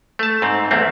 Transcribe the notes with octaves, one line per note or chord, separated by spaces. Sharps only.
A3 A5
G#2 C4
E2 A3 A#3 C4